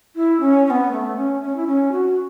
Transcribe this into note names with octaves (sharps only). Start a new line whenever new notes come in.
E4
C#4
C#4
B3
A3
C#4
C#4
E4
C#4
F#4